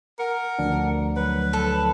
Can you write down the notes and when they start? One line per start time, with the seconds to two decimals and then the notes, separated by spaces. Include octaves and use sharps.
0.19 A#4 F#5
0.59 D2 F3 D4
1.17 F#3 B4
1.53 A4